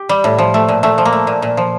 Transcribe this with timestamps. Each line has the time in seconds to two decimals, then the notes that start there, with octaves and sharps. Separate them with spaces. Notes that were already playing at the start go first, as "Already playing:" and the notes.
Already playing: G4
0.09 G3
0.24 A2
0.38 F3
0.54 A3
0.68 A#2
0.83 A#2 A3
0.98 F3
1.05 A#3
1.13 A3
1.27 A#2
1.42 A#2
1.57 F3